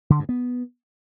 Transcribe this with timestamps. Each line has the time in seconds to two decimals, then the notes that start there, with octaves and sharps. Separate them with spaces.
0.10 D3
0.19 G2
0.29 B3